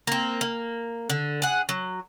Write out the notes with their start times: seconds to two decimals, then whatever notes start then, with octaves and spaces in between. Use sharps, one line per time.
0.07 A#3 C4
0.41 A#3
1.10 D3
1.42 G#4 F#5
1.69 F#3